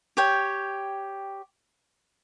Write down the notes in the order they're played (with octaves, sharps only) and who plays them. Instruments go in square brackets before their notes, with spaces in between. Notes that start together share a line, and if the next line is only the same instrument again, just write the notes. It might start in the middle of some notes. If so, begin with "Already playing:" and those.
[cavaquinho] G4 C#5 G5